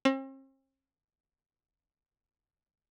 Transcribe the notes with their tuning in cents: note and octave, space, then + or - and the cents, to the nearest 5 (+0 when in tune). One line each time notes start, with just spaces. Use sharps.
C4 +45